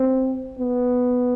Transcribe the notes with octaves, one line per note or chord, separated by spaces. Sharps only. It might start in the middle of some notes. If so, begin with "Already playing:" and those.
Already playing: C4
B3